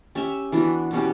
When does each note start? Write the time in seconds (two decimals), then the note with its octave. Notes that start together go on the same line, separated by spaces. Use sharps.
0.15 C#4 G4 C#5 E5
0.52 E3 B3 D4 F#4
0.91 B2 G3 C#4 G4